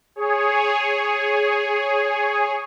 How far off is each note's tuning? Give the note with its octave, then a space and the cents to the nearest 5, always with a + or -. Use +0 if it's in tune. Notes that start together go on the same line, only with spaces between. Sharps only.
G#4 +0 C#5 +0